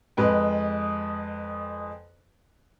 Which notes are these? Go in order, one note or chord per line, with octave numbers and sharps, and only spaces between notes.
F2 G#3 B4 G5